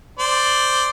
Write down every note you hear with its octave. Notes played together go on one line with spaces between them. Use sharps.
C5 D5